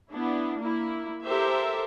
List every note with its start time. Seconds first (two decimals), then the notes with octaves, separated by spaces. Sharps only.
0.12 B3 D4 E4
0.58 A#3 E4
1.24 G4 A4 A#4 C5 E5